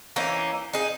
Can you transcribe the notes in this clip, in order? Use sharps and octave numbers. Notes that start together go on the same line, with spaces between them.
E3 A#3 C#4 D#4
D#4 G#4